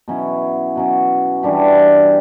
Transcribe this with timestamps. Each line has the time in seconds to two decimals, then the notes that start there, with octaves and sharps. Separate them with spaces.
0.08 B2 F#3 C#4 E4
0.75 B2 F#3 C#4
1.43 E3 G3 D4 G4